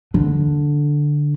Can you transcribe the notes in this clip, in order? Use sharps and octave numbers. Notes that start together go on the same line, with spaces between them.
D3